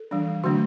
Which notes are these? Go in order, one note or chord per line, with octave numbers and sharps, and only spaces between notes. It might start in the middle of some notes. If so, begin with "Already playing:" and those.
Already playing: A4
E3 G3 D4
D3 F#3 A3 D4 F#4